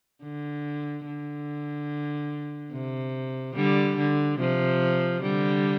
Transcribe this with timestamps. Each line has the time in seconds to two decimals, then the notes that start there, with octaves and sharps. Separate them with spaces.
0.23 D3
1.07 D3
2.72 C3
3.55 D3 G3
3.97 D3
4.38 C3 F3
5.22 D3 G3